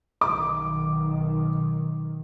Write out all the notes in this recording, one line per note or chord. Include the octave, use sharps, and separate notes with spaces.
B1 D#3 D6